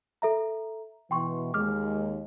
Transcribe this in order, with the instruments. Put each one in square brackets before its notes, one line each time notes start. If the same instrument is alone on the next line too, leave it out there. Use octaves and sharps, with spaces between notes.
[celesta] A4 E5 A#5
[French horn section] B2 E3 [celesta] G5 C6 C#6
[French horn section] D#2 G#3 [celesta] D6 F6